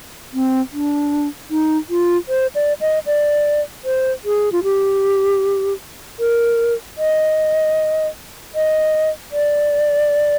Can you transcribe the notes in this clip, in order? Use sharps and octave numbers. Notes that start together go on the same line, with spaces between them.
C4
D4
D#4
F4
C5
D5
D#5
D5
C5
G#4
F4
G4
A#4
D#5
D#5
D5